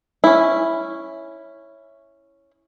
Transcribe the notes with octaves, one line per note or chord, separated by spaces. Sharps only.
C#4 E4